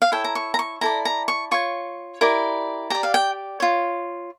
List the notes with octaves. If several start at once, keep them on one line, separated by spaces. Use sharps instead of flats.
F5
E4 A4 C#5 G5
A#5
C#6
A#5
C#6
E4 A4 D5 A#5
A#5
C#6
F4 C#5 C#6
E4 G4 A#4 D5
G4 D5 A#5
F5
G5
F4 C#5